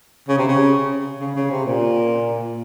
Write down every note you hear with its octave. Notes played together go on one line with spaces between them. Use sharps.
C#3
C3
C#3
C#3
C#3
C3
A#2